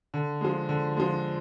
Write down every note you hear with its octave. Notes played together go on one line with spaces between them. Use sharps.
D3
F3 G#3
D3
F3 G#3